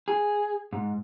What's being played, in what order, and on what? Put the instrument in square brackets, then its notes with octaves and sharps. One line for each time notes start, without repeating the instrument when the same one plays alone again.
[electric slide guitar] G#4
G#2